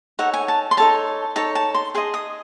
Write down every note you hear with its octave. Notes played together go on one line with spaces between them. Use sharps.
D#4 A4 C#5 F#5
G#5
A5
C6
D#4 A4 C#5 A5
D#4 A4 C#5 A5
A5
C6
G#4 D#5 C6
D#6